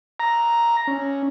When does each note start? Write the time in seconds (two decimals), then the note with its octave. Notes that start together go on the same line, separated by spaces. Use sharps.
0.20 A#5
0.87 C#4